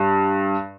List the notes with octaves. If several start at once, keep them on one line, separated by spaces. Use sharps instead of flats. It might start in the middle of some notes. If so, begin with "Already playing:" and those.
Already playing: G2